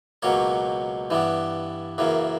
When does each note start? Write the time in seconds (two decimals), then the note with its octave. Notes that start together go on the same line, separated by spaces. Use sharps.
0.22 C#2 B2 F#3 A#3 C#5
1.10 G2 E3 G3 B3
1.98 F#2 C#3 E3 A#3